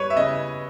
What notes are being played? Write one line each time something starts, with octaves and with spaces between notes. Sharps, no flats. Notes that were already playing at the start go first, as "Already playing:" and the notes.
Already playing: G3 B4 C#5
E5
C#3 D#5